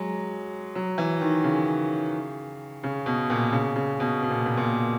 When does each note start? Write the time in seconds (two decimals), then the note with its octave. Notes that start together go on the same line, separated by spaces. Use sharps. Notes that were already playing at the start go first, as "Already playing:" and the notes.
Already playing: F#3 G#3
0.75 F#3
0.98 E3
1.21 D#3
1.44 C#3
2.83 C#3
3.06 B2
3.30 A#2
3.52 C#3
3.76 C#3
4.00 B2
4.22 B2
4.30 A#2
4.46 A#2
4.57 A#2